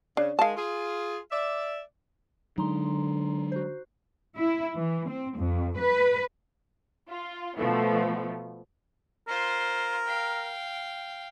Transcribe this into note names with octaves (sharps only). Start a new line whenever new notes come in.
C#3 D4
D#3 G#3 F5 A5
F4 G#4
D5 E5
D3 F#3 G#3 D#4 A#5 C6
F#4 C5
E4
E3
C4
F2
B4
F4
B2 F3 A3 B3
F4 A#4 C5
F5 G5